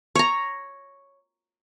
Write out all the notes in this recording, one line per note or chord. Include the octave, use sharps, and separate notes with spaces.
C#5 A#5